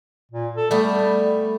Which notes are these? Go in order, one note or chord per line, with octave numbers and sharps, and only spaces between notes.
A#2
A4
G3 A3 B3